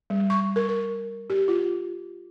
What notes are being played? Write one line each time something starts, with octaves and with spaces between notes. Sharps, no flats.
G3
C#6
A#4
A#4
G4
F4